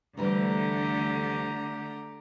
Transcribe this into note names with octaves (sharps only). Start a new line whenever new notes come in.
D2 D3 E3 G3 A3 G4 A#5